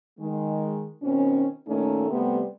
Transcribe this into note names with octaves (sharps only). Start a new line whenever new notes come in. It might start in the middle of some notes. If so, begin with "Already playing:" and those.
D#3 G#3
B2 D#3 C4 C#4
A#2 D#3 A3 C#4 D#4 A4
C3 G3 A3 B3